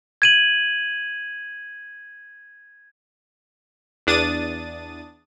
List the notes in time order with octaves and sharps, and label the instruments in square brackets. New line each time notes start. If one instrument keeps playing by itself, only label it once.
[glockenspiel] G#6 D#7 F#7
[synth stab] E2 D4 D#6 A6 D#7